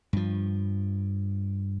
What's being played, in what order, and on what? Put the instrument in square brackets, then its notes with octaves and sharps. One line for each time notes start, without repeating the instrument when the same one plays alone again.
[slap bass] G2 F3